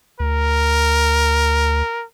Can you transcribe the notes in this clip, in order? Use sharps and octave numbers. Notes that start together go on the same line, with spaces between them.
D2 A#4